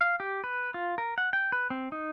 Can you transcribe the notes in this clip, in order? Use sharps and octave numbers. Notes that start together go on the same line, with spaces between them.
F5
G4
B4
F4
A#4
F#5
G5
B4
C4
D#4